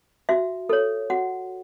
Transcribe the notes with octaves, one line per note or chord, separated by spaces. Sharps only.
F#4 E5
A4 C#5
F#4 F#5